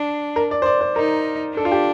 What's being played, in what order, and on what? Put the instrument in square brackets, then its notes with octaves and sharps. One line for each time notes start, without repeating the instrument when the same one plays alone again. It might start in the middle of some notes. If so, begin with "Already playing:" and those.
Already playing: [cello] D4
[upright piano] A#4
D5
C5
D5
C5
[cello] D#4 [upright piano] A#4
[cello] D4 [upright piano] A4
[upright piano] F4
G4